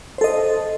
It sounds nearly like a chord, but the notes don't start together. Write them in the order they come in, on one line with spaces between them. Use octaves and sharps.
C5 A4 D#5